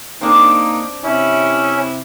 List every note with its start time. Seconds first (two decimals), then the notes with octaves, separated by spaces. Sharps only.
0.21 A#3 C4 D4 D#4
1.05 C3 C#4 E4